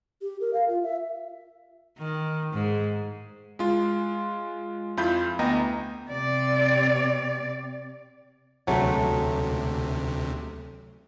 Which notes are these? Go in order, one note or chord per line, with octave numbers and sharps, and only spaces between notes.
G4
A#4
F5
F4
E5
D#3
G#2
G#3 F4
F2 E4 F4 B5 G6
D2 B3 D#5 G5 A#5
C3 D5
D2 C3 F#3 G#3 A3